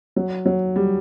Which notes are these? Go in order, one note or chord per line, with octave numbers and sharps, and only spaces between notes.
F#3
F#3
G3